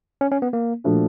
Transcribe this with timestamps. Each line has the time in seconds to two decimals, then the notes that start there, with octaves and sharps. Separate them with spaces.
0.21 C#4
0.32 C#4
0.42 B3
0.53 A#3
0.84 A#2 F3 A3 D4 F#4